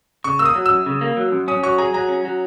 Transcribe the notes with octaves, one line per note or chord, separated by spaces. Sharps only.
C#3 C#6
A#3 E6
D#6
F#3
F#2 E6
C#3
A#3
F#3
F#2
C#4 D#6
F#3 C#6
G#4 A#5
F#3 A#5
C#4
F#3